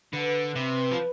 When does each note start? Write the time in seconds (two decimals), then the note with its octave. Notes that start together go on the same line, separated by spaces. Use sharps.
0.12 D3 B4
0.55 C3
0.92 F3